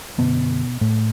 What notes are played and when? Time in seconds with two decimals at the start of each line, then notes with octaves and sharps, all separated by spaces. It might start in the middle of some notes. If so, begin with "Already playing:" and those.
0.18 F#2 B2 D3 B3
0.81 A2 A3